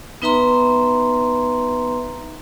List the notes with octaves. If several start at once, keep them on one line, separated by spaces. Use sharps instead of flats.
B3 D#4 B4 E5 A#5 C6